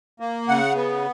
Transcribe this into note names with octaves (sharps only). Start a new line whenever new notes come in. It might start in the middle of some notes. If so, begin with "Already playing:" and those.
A#3
C#3 F#5
B3